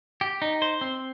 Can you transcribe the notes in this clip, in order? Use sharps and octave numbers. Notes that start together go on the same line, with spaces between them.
G4
D#4
C5
C4